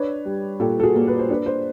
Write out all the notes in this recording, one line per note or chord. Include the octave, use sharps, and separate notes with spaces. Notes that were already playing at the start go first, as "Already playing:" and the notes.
Already playing: D4 B4 C#5
G3
A#2 G4 A4
A4
F#4 G#4
A#3
B4
C5
D4 B4
C5